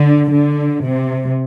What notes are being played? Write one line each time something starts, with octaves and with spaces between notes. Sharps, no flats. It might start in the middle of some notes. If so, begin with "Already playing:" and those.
Already playing: D3
D3
C3